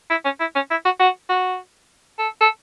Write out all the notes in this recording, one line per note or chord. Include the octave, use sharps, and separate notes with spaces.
E4
C#4
E4
C#4
E4
F#4
F#4
F#4
A4
A4